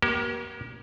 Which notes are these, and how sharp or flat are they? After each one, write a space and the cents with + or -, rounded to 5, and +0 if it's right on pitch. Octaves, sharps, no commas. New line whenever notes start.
A#3 +35 G4 -40